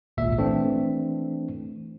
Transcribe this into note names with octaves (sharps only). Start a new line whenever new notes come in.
G#1 C#2 A#2 E5
E3 A3 C4 D4